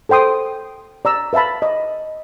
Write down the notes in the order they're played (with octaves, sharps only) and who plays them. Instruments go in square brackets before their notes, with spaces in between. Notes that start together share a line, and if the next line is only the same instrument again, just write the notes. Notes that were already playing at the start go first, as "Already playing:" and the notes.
[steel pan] A4 C5 G5 C6 D#6
D5 A#5 E6
B4 E5 F5 A5 B5
D#5